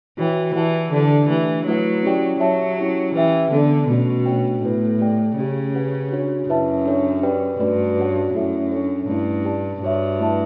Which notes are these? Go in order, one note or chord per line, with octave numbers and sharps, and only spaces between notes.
E3 F#4 C#5 G5
E3 E4 G4 D5 F#5 A5
D3 D4 G4 D5 A5
E3 A3 D4 G4
F#3 A3 E4 B4 F#5
C#4 E4 G4 D5 G5
F#3 G4 C#5 E5 A5
C#4 E4 G4
E3 C#4 G4 B4 E5 G5
D3 B3 D4 A4 D5
B2 A3 C#4 F#4
A3 D4 F#4 C#5 G5
A2 B3 E4 B4
G4 D5 G5
C#3 A3 C#4 G4
G4 B4 F#5
D4 F#4 C#5
F#2 E4 B4 E5 A5
D4 A4 C#5 E5
G4 B4 D5 G5
G2 A3 D4 F#4 B4 D5
C#4 F#4 C#5 F#5
F#2 A3 E4 A4 E5
D4 A4 C#5
G2 A3 C#4 E4
G4 D5 A5
G2 F#4 C#5 E5
A3 E4 B4 E5 A5